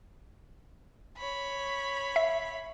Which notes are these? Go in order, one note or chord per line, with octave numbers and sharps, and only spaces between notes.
C#5 B5
E5